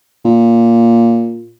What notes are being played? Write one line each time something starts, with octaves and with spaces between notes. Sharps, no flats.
A#2